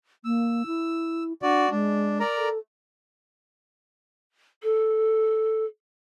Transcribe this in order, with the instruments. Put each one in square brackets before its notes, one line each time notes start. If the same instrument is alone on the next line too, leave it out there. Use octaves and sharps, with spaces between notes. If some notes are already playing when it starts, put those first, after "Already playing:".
[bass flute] A#3 [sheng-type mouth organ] E6
[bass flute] E4
[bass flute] D4 [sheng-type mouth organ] F#4 D5
[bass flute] G#3 [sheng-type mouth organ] D4
[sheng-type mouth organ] A#4 D5 A#5
[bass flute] A4
[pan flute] A4